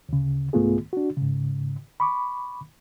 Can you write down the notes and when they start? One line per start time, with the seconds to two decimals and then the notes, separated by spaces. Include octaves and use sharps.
0.09 D2 C#3
0.53 C2 G#2 A3 B3 F4 G#4
0.93 D4 F#4
1.17 G#2 C#3
2.00 B5 C#6 D6